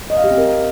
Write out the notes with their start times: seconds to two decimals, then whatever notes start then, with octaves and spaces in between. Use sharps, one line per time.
0.10 D#5
0.17 F5
0.24 G4
0.31 C4
0.38 A#4